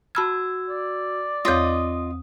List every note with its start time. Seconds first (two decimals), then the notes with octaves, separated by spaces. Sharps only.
0.15 F#4 A5 B5 E6 F6 G#6
0.69 D5
1.45 E2 C4 F4 C#5 D#5 D#6 A#6